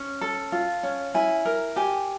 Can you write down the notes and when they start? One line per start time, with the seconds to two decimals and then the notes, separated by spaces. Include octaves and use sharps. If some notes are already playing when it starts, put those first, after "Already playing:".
Already playing: C#4
0.21 A4
0.52 F4
0.83 C#4
1.14 E4 G#5
1.45 A#4
1.76 G4 G#5